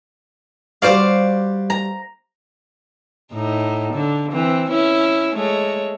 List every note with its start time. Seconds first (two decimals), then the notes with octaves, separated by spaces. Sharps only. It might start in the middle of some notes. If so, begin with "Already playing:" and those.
0.82 G3 F#4 C5 D5 F5
1.70 A#5
3.34 A2 D#4
3.94 D3
4.32 E3 C4
4.70 C#4 E4
5.35 G#3 A3 C#5